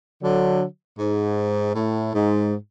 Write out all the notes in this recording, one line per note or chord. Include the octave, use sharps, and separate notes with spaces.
D3 F#3
G#2
A2
G#2